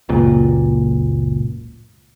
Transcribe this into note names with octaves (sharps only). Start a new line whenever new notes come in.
F#1 C#2 A#2